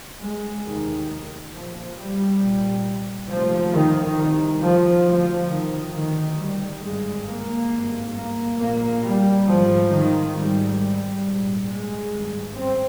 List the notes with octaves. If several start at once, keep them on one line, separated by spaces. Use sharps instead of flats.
G#3
F1 D#2 D#3
A#1 A#2 F3
G3
C2 A#2
F1 D#2 F3
D#3
C2 C3 D#3
F3
D2 C3 F3
D#3
D2 C3 D#3
G3
G#1 G2 G#3
A#3
G#1 G2
A#3
A#1 A#2 A#3
G3
G#1 G#2 F3
D#3
G#1 G#2 G3
G3
A#1 G#2
G#3
G#1 G2
C4